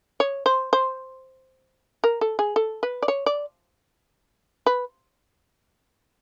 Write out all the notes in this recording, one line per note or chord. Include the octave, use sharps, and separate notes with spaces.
C#5
C5
C5
A#4
A4
G#4
A4
B4
D5
C#5
D5
B4